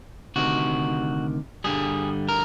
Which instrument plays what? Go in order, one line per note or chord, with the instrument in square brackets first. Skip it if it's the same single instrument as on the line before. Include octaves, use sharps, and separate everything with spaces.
[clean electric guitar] D2 C3 D#3 F#4
G2 D3 G3 G#4
A#4